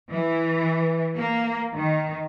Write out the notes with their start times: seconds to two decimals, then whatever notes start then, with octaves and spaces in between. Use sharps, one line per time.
0.11 E3
1.17 A#3
1.74 D#3